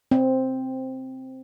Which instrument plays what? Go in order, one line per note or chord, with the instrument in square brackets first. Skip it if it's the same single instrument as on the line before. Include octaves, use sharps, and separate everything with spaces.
[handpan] C4